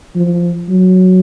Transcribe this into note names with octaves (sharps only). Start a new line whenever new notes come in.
F3
F#3